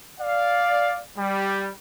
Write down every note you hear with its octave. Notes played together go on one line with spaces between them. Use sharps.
D5 F5
G3